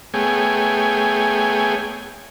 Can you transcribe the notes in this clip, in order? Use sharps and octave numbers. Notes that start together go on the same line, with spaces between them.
A3 B3 G#4 C#5 G5 G#5